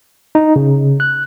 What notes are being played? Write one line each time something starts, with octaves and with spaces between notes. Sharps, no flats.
D#4
C#3
F#6